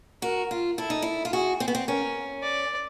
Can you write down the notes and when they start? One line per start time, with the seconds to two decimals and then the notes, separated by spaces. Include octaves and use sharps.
0.22 F#4 A#4
0.51 F4
0.78 E4 A4
0.90 D#4
1.02 E4
1.25 F4
1.33 F#4 G#4
1.60 C4
1.68 B3
1.75 C4
1.88 C#4 A#4
2.43 D5